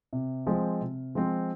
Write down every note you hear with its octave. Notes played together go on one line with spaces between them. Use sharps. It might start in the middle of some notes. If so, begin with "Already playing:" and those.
C3
F3 G#3 C4
C3
F3 G#3 C4